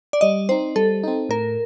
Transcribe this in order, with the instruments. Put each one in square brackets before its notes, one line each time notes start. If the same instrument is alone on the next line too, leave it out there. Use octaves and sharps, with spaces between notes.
[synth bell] D5
[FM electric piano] G3 [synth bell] D#5
[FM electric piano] C4 D#4 [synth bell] C5
[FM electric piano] G3 [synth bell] A4
[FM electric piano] C4 D#4
[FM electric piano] A2 [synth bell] A#4